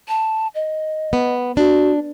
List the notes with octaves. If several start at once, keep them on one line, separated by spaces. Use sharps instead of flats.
A5
D#5
B3
D4 F#4